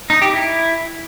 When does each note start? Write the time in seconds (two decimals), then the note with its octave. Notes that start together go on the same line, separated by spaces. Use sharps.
0.10 D#4
0.22 G4
0.33 E4